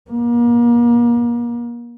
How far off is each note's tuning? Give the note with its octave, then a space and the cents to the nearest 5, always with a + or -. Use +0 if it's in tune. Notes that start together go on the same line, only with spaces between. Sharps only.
A#3 +35